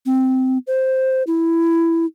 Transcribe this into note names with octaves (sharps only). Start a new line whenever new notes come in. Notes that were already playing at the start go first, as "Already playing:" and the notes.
C4
C5
E4